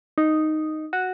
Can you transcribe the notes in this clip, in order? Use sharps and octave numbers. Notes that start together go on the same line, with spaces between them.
D#4
F#4